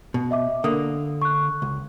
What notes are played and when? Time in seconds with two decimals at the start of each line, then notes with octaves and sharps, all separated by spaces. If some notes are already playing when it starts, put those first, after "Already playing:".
0.14 B2
0.31 D#5 E5 D6
0.64 D3 A#3 D#6
1.22 C#6 F#6
1.62 C#2